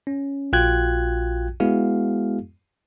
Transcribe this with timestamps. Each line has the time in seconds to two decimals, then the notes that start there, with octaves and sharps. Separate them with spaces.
0.07 C#4
0.53 A#1 F4 F#4 G5 F#6 G#6
1.60 G#3 B3 E4 F#4 G#4 F5